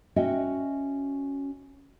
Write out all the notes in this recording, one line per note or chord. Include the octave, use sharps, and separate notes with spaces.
C#4 F#4 D#5 E5 G5